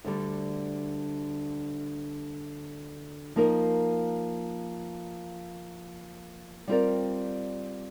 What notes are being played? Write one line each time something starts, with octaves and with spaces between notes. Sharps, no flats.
D2 D3 G3
F3 A#3 D#4 A#4 D#5
G3 C4 F4 A#4 D5